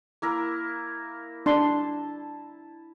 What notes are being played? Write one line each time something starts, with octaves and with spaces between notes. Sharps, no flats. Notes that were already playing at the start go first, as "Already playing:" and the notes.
A#3 E4 A#4
D4 A5 C6